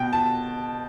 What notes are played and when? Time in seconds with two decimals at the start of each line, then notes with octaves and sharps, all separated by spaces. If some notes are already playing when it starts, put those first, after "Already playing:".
Already playing: B2 G5
0.13 A5